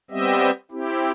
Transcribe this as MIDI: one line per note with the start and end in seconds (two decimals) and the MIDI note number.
0.11 0.51 55
0.11 0.51 59
0.11 0.51 60
0.11 0.51 67
0.11 0.51 75
0.11 0.51 76
0.71 1.11 60
0.71 1.11 64
0.71 1.11 67